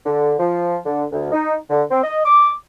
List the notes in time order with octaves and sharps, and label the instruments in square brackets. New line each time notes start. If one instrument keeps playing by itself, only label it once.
[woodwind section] D3
F3
D3
D2
D#4
D3
C4
D#5
D6